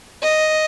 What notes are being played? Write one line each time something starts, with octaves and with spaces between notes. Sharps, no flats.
D#5